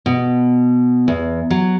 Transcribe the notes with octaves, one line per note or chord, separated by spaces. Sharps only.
B2
E2
F#3